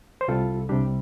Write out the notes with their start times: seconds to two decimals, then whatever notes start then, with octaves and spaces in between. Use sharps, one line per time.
0.21 C5
0.28 C2 C3 G3 F4 A4
0.69 C2 C3 G3 D4 G4